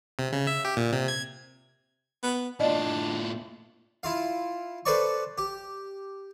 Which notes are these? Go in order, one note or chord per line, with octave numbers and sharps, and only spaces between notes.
C3
C#3
E5
G4
A#2
C3
G#6
B3
A2 D4 F4 D5 D#5
E4 F4 F5
A4 B4 C5 D5 A5 C#6
G4